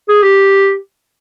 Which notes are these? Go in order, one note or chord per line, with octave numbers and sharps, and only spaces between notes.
G#4
G4